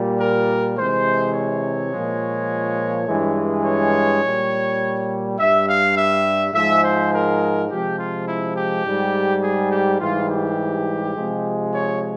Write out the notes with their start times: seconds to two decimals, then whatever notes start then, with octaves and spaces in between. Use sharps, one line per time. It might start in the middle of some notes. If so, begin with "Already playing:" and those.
Already playing: A#2 G3
0.19 A#4
0.77 C3 E3 G#3 C5
1.35 C#5
1.92 A#2 F3 G#3
3.08 G2 E3 G#3
3.65 C#5
4.23 A#2 G3
5.39 G2 G3 E5
5.68 F5
5.97 E5
6.54 G#2 F3 G#3 E5
6.83 C5
7.12 A#4
7.70 C3 F3 G#3 G4
7.98 F4
8.27 E4
8.57 G4
8.86 G#2 G3
9.43 G#4
9.72 G4
10.00 G#2 E3 G3 F4
10.30 G4
11.16 C3 F3 G#3
11.74 C#5